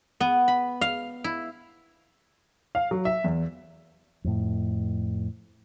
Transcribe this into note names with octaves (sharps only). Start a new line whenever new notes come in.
B3
B5
F5
E4
F5
F#3
E5
E2
F2 A2